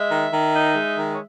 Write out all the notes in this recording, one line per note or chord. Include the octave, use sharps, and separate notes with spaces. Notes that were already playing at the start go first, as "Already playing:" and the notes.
Already playing: G#3 E5
D#3
D#3
D#4
G#3
D#3
C#5